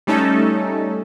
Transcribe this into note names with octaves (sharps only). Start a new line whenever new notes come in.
G3 A3 C#4 D#4 A4